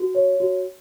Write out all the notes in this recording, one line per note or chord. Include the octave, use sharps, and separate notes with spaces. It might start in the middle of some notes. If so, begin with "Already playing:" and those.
Already playing: F#4
C#5
F#4